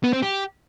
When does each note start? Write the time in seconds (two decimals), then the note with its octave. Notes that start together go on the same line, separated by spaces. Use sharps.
0.04 B3
0.13 C4
0.23 G4